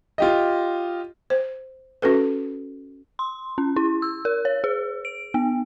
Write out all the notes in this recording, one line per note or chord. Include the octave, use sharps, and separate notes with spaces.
F4 G4 D#5
C5
C#4 F#4 A4 B4
C6
C#4
E4
E6
A#4
C#5
G#4
D7
B3